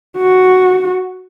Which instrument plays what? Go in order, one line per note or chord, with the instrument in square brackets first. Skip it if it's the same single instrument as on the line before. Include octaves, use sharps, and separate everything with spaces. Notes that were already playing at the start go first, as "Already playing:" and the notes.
[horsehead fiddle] F#4